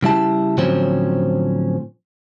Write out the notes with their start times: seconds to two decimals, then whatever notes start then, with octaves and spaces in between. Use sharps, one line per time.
0.03 C#3 G3 E4 A5
0.57 A2 D3 F3 F#3 C4 C#4